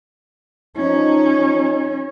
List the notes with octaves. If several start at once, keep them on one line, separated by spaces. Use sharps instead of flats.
F3 C#4 D#4